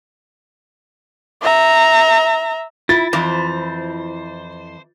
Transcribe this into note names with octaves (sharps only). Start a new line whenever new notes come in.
E5 A#5
E4 F4 A6
F2 E3 E4 C5